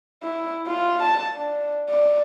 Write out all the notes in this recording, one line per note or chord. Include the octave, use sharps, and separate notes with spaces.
E4
F4
A5
D4
D5